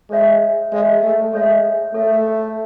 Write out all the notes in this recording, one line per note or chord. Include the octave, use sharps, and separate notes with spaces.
G#3 A4 C#5 E5
G#3 A4 C#5 E5
A3
G#3 A4 C#5 E5
A3 A4 C#5 E5